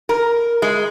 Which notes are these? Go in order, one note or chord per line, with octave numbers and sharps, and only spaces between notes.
A#4
G#3